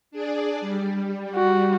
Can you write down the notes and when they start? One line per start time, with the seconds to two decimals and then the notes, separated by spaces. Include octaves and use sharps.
0.11 D4 G#4 D5
0.61 G3
1.36 F#4